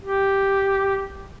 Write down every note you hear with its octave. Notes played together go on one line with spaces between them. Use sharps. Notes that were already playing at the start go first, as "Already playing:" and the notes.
G4